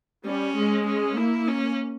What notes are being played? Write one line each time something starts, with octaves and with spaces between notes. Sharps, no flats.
G3 C#4
G#3
C#4
A#3 E4
C#4